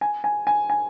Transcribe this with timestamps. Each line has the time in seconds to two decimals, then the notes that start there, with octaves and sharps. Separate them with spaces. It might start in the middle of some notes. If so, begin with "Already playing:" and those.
0.01 G#5
0.24 G#5
0.47 G#5
0.70 G#5